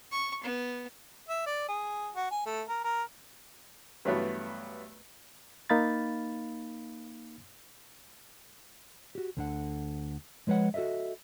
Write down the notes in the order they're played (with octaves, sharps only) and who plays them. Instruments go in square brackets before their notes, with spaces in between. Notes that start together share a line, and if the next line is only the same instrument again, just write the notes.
[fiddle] C#6
B3
[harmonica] E5
D5
G#4
F#4
G#5
A3
A#4
A#4
[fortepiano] G2 E3 F#3 A3 B3
[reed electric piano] A#3 D#4 F5 B5 A6
[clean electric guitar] F#4 G4
D2 D3 F#5
F3 G#3 B4 C#5 F#5
F#4 A4 A#4 D#5 E5